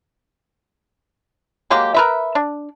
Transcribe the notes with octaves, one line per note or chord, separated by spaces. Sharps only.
F#3 G#3 A#3 G4
A#4 B4 E5
D4